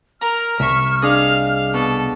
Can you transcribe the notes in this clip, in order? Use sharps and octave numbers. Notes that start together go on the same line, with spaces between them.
A#4 A#5 F6
C2 E5 C#6
D4 G#4 D#5 F5
B2 A4